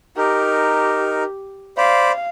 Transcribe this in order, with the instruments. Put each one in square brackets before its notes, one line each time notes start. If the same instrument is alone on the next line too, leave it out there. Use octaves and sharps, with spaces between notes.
[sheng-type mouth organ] D#4 A#4 [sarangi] G4
[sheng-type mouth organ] C5 D5 B5 [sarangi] F5